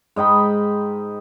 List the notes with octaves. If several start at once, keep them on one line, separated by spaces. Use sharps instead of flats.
G#2 D#5 G5 B5